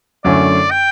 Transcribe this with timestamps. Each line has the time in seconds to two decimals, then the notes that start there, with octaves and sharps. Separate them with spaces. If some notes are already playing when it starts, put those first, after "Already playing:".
0.24 F#2 D3 A3 C#4 E4 D5
0.71 G5